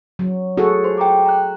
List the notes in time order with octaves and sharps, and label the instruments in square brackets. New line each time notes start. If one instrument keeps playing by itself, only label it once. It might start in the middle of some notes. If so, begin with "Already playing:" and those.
[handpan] F#3
[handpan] F#4 G#4 A4 [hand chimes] C#5
[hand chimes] F4 C5 C6
G5 A#5 D6
A#5 F#6